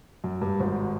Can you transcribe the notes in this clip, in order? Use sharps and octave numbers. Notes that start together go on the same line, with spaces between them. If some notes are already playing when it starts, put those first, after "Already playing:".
F#2
G2
G#1 G#2